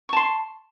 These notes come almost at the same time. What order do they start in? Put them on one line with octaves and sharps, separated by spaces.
C#6 A5 C6